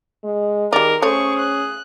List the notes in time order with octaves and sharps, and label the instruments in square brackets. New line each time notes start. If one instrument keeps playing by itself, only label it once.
[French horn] G#3
[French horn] D#3 [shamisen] G3 D5 [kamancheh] G#4 [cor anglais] A#4
[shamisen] A3 C#5 [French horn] C#4 [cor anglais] G#4 [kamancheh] C5 C#6
[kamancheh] F#6